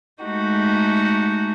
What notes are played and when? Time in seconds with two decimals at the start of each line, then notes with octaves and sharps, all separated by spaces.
0.23 G#3 A3 D#4 F#4 G4